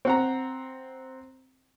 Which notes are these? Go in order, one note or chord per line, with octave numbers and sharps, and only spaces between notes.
C4 F#5 A#5